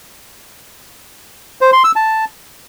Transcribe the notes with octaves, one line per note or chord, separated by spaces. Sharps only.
C5
C6
E6
A5